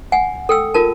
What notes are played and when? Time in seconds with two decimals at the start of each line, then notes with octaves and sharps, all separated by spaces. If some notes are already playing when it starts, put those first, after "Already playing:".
0.12 F#5 G#5
0.49 A4 G5 E6
0.74 F4 A#4 A5